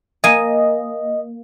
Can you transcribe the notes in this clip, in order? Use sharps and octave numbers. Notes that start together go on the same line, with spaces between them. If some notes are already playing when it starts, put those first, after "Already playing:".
A#3 D#5 G#5